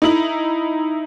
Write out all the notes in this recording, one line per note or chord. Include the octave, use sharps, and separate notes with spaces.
D#4 E4 F#7